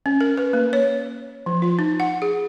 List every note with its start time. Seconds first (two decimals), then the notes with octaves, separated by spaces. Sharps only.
0.06 C#4
0.21 A#4
0.37 B4
0.53 A#3
0.73 C#5
1.46 F3
1.62 F4
1.79 D#4
2.00 F#5
2.22 G#4